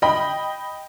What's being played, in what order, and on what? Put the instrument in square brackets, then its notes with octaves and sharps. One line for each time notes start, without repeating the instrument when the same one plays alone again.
[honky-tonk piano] D#5 G5 B5